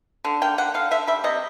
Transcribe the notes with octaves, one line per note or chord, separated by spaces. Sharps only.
D3
A#3 G5
D3 F#5
D3 F5
D3 E5
G3 E5
C3 D#5